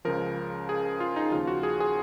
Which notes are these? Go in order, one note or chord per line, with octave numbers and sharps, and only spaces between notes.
C#2 C#3 F3 A#4
G#4
F4
D#4
D#2 C#3 F3 F4
F#4
G#4
G#4